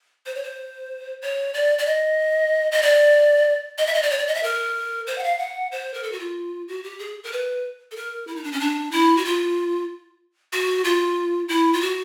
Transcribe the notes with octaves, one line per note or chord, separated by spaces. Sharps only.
C5
C#5
C5
C#5
D5
D5
D#5
D#5
D5
D#5
E5
D#5
D5
C#5
D5
D#5
E5
A#4
C5
F#5
F5
F#5
C5
A#4
A4
F#4
F4
F#4
G4
G#4
A#4
B4
A4
A#4
E4
D#4
D4
C#4
D4
E4
F#4
F4
F#4
F4
E4
F4
F#4